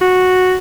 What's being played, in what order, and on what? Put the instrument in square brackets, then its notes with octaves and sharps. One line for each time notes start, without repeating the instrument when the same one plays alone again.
[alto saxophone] F#4